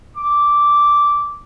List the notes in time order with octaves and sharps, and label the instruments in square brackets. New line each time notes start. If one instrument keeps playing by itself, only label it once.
[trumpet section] D6